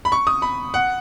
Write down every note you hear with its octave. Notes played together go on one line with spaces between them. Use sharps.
B5
C#6
D#6
B5
F#5